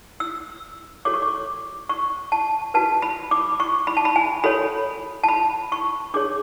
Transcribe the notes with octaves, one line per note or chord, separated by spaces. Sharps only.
E6
F#4 A4 C#5 D6
C#6
D6
C#6
A5
F#4 B4 A5
B5
D6
C#6
B5
A5
B5
G#5
F#4 A4 C#5 B5
A5
B5
C#6
D4 G#4 C#5 D6